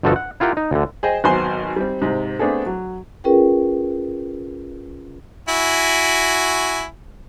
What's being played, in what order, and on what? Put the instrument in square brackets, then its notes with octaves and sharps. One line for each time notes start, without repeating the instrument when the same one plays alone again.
[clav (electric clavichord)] G1 B2 F3 F#4 A4
F#5
E4 F4 G4 A#4 F#5 G5
D#4
D2 D3
[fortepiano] G#4 C5 D#5 G5
G#1 F#3 B3 C5 G#5 C6
G3 C4
G#2 C3
A3 B3 C4 D4 G#4 A4
F#3
[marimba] C#4 F4 G#4 A#4 B4 G5
[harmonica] E4 F#4 G#5